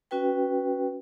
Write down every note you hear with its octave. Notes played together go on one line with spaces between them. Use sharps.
C#4 F#4 B4 G5